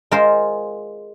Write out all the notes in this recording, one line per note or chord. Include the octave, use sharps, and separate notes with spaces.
G#3 F4 A#4 C5